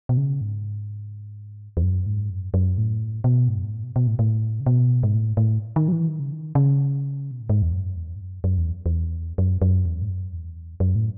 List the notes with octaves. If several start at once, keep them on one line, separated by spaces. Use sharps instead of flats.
B2
C#3
G#2
E2
F#2
G#2
F#2
F#2
A2
B2
G#2
F#2
G#2
A2
B2
B2
A2
A2
C#3
B2
G#2
A2
A2
D#3
F#3
E3
D#3
C#3
D#3
C#3
B2
A2
G#2
E2
F#2
E2
G#2
F#2
F#2
E2
E2
F#2
F#2
E2
G#2
F#2
E2
F#2
A2